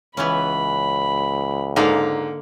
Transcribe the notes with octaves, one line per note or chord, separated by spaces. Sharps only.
C#2 E3 B3 C#4 B5
G#2 D3 A#3 F5